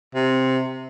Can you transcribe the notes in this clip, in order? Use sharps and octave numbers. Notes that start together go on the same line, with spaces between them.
C3